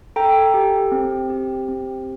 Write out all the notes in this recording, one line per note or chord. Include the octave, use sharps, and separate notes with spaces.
A4 G5 A#5
G4
C4
G4
C4